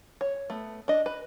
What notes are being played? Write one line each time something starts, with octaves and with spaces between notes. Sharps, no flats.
C#5
A3 B3
D4 D#5
B4